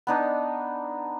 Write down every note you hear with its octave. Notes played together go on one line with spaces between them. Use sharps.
B3 D4 D#4